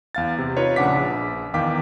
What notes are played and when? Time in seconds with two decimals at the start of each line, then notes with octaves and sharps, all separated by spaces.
0.15 E2 F5 A6
0.38 C3
0.57 D#4 F4 B4 C#5
0.76 A#1 C#3 D4 F#5 D6 B6
0.97 A#1
1.54 E2 D#3 F5 G5 D6 B6